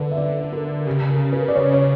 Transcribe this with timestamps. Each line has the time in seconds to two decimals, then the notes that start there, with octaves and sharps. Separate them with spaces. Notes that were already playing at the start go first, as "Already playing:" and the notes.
Already playing: D3 B4
0.11 E5
0.17 D5
0.52 A#4
0.86 C#3 G4
1.10 A#4
1.33 B4
1.48 D5
1.56 C#5
1.73 C#5